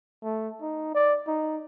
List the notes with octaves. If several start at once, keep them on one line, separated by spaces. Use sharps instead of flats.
A3
D#4
D5
D#4